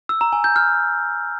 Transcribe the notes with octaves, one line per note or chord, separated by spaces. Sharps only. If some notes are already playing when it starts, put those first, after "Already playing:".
E6
A#5
G#5
G6
F6